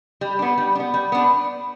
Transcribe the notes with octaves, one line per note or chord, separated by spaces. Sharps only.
G3
B3 D4
G3
D4
B3
G3
B3 D4